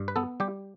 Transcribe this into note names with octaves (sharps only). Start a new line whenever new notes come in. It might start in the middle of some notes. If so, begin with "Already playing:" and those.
Already playing: G2
B4
B3 A4
G3 G4